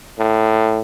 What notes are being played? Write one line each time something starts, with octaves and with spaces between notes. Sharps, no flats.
A2